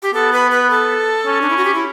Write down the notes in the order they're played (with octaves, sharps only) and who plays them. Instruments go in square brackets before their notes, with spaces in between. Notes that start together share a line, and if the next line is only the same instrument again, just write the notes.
[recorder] G4
[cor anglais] B3 [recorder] A4
[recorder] B4
B4
A4
[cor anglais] C#4
[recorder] D4
E4
F#4
G4
E4